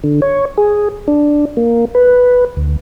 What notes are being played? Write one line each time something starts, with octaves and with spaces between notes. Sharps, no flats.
D3
C#5
G#4
D4
A#3
B4
D2